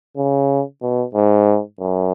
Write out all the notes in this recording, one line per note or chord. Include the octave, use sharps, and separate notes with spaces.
C#3
B2
G#2
F#2